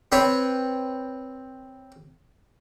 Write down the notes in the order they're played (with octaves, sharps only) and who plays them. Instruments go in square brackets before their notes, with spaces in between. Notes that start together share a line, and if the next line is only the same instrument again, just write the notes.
[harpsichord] C4 B4 C#5